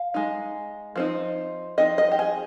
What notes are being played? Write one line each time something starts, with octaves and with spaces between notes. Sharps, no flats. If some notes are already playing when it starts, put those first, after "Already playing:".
Already playing: F5
G#3 D#4
F3 C4 D#4
F3 C4 D#4 D#5
D#5
G4
G#4